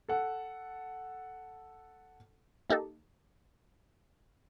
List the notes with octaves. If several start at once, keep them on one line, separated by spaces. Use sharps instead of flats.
A4 F#5
A#3 D#4 G4 A4